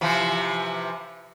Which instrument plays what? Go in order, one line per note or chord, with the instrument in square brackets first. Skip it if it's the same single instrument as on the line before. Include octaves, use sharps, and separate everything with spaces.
[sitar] C3 E3 F3